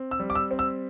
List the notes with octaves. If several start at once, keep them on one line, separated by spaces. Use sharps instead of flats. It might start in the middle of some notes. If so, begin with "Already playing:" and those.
Already playing: C4
E6
G3
D6
E6
C4
E6